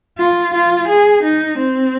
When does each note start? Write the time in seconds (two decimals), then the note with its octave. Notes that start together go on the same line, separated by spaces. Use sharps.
0.18 F4
0.54 F4
0.88 G#4
1.24 D#4
1.58 C4